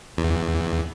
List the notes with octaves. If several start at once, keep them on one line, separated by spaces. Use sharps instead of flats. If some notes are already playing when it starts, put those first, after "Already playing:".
E2